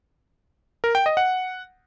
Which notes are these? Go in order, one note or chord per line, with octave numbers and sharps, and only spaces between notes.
A#4
G5
D#5
F#5